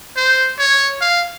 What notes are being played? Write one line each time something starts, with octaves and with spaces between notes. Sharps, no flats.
C5
C#5
F5